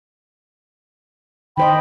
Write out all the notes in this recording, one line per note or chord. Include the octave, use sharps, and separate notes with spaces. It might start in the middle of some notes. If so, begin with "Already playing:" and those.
D#3 C5 D#5 G5 B5